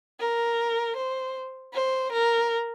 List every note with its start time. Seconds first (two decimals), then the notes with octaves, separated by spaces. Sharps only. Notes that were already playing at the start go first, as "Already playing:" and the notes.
0.20 A#4
0.96 C5
1.74 C5
2.12 A#4